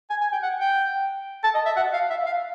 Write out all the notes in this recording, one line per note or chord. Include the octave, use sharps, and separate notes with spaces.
G#5
G#5
G5
F#5
G5
A5
D#5
E5
F#5
F5
E5
F5